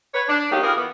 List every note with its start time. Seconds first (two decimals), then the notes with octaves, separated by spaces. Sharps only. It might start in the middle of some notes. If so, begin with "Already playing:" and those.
0.15 B4 C#5
0.28 D4
0.51 F#3 G3 A3 A#3 D#4 G4
0.63 B3 F4 G4 G#4 A#4
0.76 E3 B3